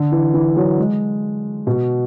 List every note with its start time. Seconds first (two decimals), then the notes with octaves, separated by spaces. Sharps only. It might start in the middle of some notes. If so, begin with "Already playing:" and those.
Already playing: D3
0.12 E3
0.34 E3
0.56 F#3
0.78 G#3
1.67 B2